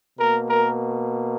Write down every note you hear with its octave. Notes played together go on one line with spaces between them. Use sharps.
B2 A#3 A#4
A#4